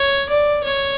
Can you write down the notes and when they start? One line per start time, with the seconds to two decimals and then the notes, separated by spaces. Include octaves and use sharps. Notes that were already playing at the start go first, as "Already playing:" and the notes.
Already playing: C#5
0.29 D5
0.64 C#5